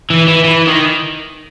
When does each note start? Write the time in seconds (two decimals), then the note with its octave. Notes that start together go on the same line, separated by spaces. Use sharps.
0.10 E3
0.28 E3
0.44 E3
0.67 D#3